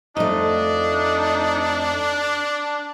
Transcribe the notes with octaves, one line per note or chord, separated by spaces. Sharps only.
F2 A3 D4 D#4